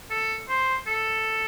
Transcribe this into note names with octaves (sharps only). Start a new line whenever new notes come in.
A4
C5
A4